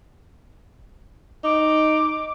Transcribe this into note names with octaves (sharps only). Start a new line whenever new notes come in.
D#4 D6